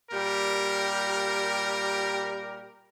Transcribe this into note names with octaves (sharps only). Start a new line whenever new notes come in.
A#2 G3 G4 A#4